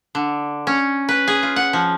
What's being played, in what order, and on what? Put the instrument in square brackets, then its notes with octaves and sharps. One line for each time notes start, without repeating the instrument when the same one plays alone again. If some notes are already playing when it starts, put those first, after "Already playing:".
[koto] D3
C#4
B4
G#4
F4
F#5
F3